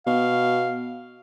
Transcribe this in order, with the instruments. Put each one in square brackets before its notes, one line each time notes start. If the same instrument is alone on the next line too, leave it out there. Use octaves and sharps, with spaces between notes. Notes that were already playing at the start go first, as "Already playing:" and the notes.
[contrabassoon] B2 [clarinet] F5